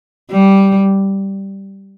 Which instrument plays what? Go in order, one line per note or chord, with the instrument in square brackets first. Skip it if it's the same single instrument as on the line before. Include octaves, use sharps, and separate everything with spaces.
[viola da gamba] G3